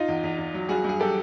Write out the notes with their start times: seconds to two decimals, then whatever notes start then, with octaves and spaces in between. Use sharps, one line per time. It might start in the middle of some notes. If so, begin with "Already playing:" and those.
Already playing: D#4 F4
0.08 E2
0.23 E2
0.38 E2
0.54 F#3
0.69 G2 F#4 G#4
0.84 G2 G#4
1.00 F#3 G4 A4